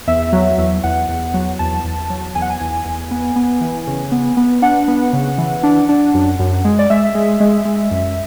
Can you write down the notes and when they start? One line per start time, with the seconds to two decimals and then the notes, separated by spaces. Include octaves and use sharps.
0.07 E2 E5
0.33 F#3
0.58 E2
0.83 E2 F#5
1.09 E2
1.34 F#3
1.59 E2 A5
1.84 E2
2.10 F#3
2.35 E2 G#5
2.42 F#5
2.50 G#5
2.60 E2
2.85 E2
3.11 B3
3.36 B3
3.61 E3
3.87 C#3
4.12 B3
4.37 B3
4.62 D4 F#5
4.88 B3
5.13 C#3
5.38 E3
5.63 D4
5.89 D4
6.14 F#2
6.39 F#2
6.65 G#3
6.79 D5
6.90 G#3 E5
7.15 G#3
7.40 G#3
7.65 G#3
7.91 F#2